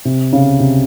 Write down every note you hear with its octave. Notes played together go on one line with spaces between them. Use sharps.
C3
C#3
C3